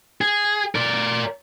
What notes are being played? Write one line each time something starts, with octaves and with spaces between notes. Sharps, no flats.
G#4
A#4 D5